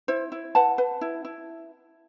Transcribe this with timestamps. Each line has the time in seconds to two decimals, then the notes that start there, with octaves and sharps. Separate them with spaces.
0.08 E4 C5
0.32 E4
0.55 B4 F#5 A5
0.78 B4
1.01 E4
1.25 E4